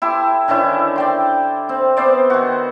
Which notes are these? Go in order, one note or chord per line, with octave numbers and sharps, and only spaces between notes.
E4 G4 A4 C6
D3 D#3 C#4 E4
D5 G5 C6
C4
B3 C4 C5 D5
D#3 F#4